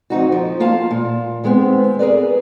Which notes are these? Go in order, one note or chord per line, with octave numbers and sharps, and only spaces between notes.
F2 C4 D#4 F#4
F3
A#3 F4 F5 A5
A#2
D#3 G#3 B3 C4
G#4 A#4 B4 D5